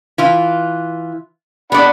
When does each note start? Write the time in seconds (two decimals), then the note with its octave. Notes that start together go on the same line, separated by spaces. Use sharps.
0.18 E3 F4
1.72 B3 D4 D5 F#5 B5